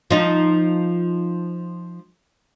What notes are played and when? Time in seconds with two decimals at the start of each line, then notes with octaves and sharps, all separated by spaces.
0.11 F3 D#4